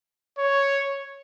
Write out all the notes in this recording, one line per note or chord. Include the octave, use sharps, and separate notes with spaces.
C#5